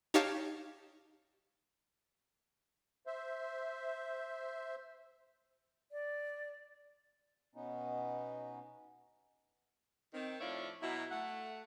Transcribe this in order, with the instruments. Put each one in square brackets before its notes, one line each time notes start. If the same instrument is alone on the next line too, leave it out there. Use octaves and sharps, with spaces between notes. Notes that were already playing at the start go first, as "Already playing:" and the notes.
[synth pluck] D#4 G4 C#5 F5 A5
[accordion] C5 E5
[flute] D5
[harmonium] B2 B3 C#4 D#4
[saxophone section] D#3 C4
A2 F3 C#5 D5 E5 F5
B2 F#3 D#4 E4
A3 F#5